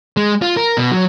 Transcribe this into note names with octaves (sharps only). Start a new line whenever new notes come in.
G#3
F4
A#4
B2
F#3